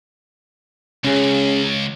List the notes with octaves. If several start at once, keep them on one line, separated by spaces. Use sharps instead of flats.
C#2 C#4 G#4